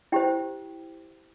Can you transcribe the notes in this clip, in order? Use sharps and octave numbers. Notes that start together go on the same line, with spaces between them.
E4 G4 C5 G5